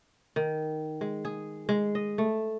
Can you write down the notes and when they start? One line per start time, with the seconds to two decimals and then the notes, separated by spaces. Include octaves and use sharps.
0.36 D#3
1.01 G#3
1.25 G#4
1.69 G#3
1.95 D#5
2.18 A3